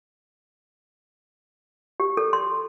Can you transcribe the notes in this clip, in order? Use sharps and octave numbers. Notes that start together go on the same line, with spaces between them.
G4
A4
C6